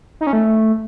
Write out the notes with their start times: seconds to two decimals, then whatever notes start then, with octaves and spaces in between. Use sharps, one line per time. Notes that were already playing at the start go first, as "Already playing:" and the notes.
0.21 D#4
0.27 C#4
0.33 A3